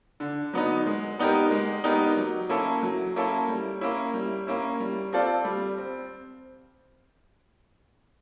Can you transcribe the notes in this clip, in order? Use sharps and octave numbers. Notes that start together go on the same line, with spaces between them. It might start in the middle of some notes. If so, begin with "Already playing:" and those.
D3
F#3 B3 D#4
G#3
B3 D#4 G4 A#4
G#3
B3 D#4 G4 A#4
F#3
A#3 C#4 E4 A4
F#3
A#3 C#4 E4 A4
G3
A#3 C#4 E4
G3
A#3 C#4 E4
G3
C4 F4 A4 D5
G3
C4